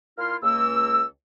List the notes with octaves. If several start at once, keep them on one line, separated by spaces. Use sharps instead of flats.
A#2 A#3 E4 F4 C6 F6
C#2 A#3 E6